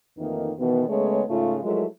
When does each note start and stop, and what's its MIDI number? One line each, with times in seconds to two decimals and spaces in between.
0.18 0.52 41
0.18 0.52 51
0.18 0.52 52
0.18 0.52 57
0.18 0.52 58
0.18 0.52 63
0.58 0.84 47
0.58 0.84 51
0.58 0.84 52
0.58 0.84 59
0.89 1.22 49
0.89 1.22 56
0.89 1.22 57
0.89 1.22 59
0.89 1.22 73
1.28 1.58 44
1.28 1.58 49
1.28 1.58 57
1.28 1.58 65
1.63 1.85 53
1.63 1.85 54
1.63 1.85 56
1.63 1.85 57
1.63 1.85 64
1.63 1.85 70